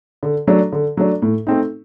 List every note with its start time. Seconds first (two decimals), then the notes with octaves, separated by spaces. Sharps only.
0.23 D3
0.47 F#3 A3 D4
0.72 D3
0.97 F#3 A3 D4
1.22 A2
1.47 A3 C4 D#4